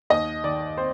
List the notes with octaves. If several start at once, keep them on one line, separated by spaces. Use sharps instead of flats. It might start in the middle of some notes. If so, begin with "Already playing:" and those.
D#2 D#5
D#3 D5
C4 C5